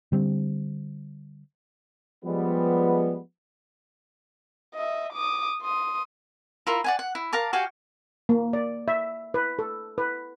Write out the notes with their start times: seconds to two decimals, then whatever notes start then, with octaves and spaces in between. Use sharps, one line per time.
0.12 D3 G3 C4
2.25 F3 G3 G#3 B3
4.74 D#5 E5
5.13 D6 D#6
5.62 C6 D#6
6.67 E4 F4 A#4
6.84 D5 F#5 G#5
6.99 F#5
7.15 E4
7.32 A#4 F5 A5 D6
7.53 F#4 G4 F5 G#5
8.29 A#3
8.53 D5
8.88 E5
9.34 B4
9.59 A4
9.98 B4